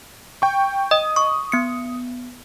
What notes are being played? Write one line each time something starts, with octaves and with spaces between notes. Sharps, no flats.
G5 C#6
D#5 D#6
C#6 D#6
B3 C#7